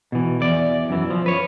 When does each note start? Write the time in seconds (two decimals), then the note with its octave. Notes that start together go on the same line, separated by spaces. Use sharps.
0.12 B2 E3
0.41 E2 D5
0.90 F#2 E3
1.10 F3
1.26 B4 C#5